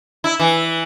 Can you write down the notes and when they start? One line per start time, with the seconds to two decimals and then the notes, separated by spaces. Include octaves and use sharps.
0.24 E4
0.40 E3